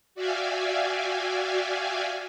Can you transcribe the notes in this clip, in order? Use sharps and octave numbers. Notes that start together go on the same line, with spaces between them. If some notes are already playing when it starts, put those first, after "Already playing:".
F#4 D5 E5 F5 G5 G#5